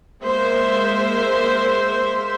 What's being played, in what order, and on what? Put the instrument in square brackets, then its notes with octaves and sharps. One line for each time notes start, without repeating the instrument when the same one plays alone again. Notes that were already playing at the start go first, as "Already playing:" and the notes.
[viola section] G#3 A#3 C5 E5